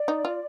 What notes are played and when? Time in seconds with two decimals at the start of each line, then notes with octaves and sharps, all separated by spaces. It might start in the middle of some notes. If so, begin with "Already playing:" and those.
Already playing: D5
0.08 D#4
0.25 F4